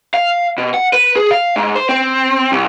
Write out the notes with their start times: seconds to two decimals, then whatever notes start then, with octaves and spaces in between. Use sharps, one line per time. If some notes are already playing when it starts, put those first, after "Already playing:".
0.14 F5
0.58 B2
0.74 F#5
0.93 B4
1.16 G#4
1.31 F5
1.56 G#2
1.76 C5
1.89 C4
2.52 C2